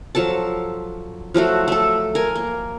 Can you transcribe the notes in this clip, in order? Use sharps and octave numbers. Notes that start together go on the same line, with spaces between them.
F3 F#3 A4 A5
F3 F#3 A3 F#4
A3 A4
A#4 G#5
A#3